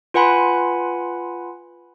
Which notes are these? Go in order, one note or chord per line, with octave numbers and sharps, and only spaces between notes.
F4 B4 F#5 G#5 B5 C6